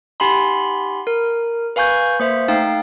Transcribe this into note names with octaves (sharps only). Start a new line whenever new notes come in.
D#4 G4 F#5 G#5 B5 C6
A#4
B4 F5 G#5 C#6 G6 G#6
A#3 C5 E5
A3 D#4 F5 G5